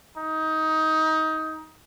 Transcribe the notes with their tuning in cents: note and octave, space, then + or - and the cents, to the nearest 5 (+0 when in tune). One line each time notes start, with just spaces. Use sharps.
D#4 +20